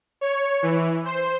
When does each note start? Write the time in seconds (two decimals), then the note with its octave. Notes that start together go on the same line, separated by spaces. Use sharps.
0.21 C#5
0.62 E3
1.05 C5